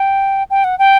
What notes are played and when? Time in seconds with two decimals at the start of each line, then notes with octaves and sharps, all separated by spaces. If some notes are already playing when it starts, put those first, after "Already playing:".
Already playing: G5
0.50 G5
0.64 F#5
0.79 G5